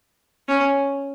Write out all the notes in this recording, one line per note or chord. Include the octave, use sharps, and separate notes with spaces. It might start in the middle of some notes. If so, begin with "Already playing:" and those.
C#4